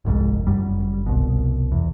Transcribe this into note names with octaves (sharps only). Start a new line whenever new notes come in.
G1 C2 F2 G#2
G1 F#2 G3
F1 C2 B2
E2